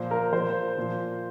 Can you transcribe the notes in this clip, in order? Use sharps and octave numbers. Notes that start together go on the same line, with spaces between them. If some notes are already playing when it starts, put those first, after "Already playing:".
Already playing: A#2 F3 C5
A#4
A#2 F3 C5
A#2 F3